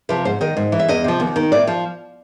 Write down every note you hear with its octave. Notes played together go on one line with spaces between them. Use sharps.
C3 F3 B4
G#2 C5
D#3 D#5
G#2
E3
E5
E2 D#5
C3 F3
D#2
D#3
A2 D5
F3